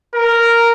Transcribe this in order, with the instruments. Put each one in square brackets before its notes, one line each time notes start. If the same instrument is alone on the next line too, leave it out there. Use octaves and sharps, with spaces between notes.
[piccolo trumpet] A#4